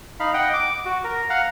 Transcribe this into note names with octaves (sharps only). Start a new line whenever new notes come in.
D#4 F5 B5
D#5 F#5 G5
D6
F#4
A#4
F5 F#5 A#5